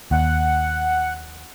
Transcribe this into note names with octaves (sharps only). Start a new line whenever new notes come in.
D#2 F#5